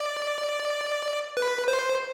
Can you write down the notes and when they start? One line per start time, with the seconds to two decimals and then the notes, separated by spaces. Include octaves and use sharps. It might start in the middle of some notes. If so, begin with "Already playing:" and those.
Already playing: D5
1.37 B4
1.68 C5